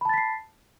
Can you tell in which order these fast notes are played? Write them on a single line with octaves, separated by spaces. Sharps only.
B5 A5 A6 B6 C7